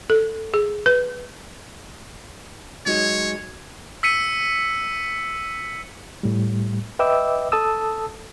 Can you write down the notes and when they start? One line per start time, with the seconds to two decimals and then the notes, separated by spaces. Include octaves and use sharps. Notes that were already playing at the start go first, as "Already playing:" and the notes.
0.10 A4
0.54 G#4
0.86 B4
2.86 F#3 G#3 D#4 C#5
4.03 E6 B6 C#7 D#7
6.23 A2 G3
6.99 B4 D#5 E5 G5 D6 E6
7.52 A4 A5 D#6 E6